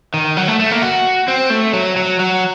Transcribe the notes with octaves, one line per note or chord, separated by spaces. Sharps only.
D#3
F#3
A3
A3
A#3
F#4
C4
A3
F#3
F#3
F#3